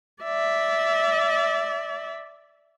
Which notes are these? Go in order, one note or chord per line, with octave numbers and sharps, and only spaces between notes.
D5 E5